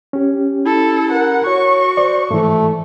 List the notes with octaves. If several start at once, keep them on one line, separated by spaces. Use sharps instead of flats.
C#4 G4
E4 A4
A#4 F#5
F#4 C#5 C#6
C5 D5
G#2 E3 A3